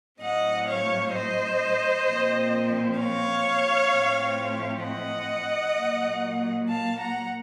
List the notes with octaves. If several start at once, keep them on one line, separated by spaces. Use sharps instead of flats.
A2 F#3 A3 C4 D#5 F#5
C#5 F5
C5 D#5
A#2 F3 C4
C#5 F5
A2 F3 A3 C4
D#5 F#5
A#2 F#3 A#3
F5 A5
F#5 A#5